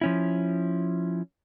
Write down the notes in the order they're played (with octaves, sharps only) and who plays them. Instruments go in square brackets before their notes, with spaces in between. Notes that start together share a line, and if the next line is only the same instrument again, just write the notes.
[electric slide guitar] F3 C#4 E4